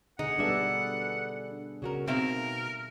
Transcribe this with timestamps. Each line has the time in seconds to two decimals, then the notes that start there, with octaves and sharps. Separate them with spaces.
0.19 B2 D3 D#4 G#4 F#5
0.38 G3 B3 D4 A4 B4 E5
1.82 C#3 F#4 A#4
2.07 B2 C4 D#4 A#4 E5 F5